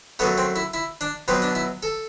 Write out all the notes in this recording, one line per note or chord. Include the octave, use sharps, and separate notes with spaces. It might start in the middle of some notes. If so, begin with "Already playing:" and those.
F#2 F#3 A3 B3
C4
E4
E4
D4
B2 F#3 B3 C4
D4
E4
A4